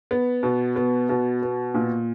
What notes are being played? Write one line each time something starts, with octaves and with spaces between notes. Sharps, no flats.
B3
B2
B3
B2
B3
A#2